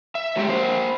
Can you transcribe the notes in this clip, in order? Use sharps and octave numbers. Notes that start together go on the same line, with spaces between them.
E5
F#3 G#3 A3 G4
A#3 C5